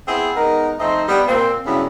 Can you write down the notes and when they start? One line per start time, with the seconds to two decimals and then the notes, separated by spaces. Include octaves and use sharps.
0.07 B3 C4 E4 G#4
0.35 G#3 B3 D#4 A#4
0.79 F2 A3 C4 D#4 C5 D#5
1.08 G3 B3 D4
1.27 A#2 C4
1.66 G2 C#3 F#3 B3 E4